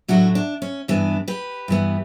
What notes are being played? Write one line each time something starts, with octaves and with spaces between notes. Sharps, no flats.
A2 F#3 A3 D4 F#4
D4
C#4
G2 E3 B3 D4
G4 B4
G2 E3 B3